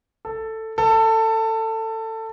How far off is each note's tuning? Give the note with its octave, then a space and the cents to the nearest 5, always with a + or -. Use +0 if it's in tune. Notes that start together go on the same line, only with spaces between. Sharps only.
A4 +10
A4 +20